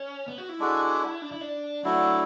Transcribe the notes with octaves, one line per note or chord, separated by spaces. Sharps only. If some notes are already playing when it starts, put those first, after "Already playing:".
Already playing: C#4
B3
F#4
E4
G#3 D4 F#4 A4
D4
E4
D4
F#3 A3 D4 E4